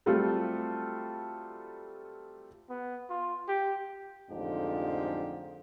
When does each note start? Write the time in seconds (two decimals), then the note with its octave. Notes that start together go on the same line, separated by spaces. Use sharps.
0.06 F#3 G3 A3 C4 F4 A4
2.70 B3
3.10 F4
3.48 G4
4.30 A1 F2 G#2 D3 F3 G4